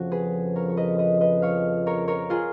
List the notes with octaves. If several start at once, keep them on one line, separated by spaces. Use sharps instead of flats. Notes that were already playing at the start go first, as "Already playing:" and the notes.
Already playing: F2 C#3 F3 F#4
G#4 B4
A#4 C#5
C#5
B4 D#5
B4 D#5
B4 D#5
C#5 F5
A#4 C#5
A#4 C#5
F4 G#4